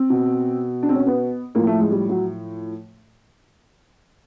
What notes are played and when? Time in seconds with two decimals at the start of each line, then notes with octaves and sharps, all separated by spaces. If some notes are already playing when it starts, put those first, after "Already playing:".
Already playing: C4
0.10 B2
0.83 D4
0.89 C4
0.95 C#4
1.07 B3
1.55 A2 F3 A#3
1.67 A3
1.79 G#3
1.91 G3
2.09 F#3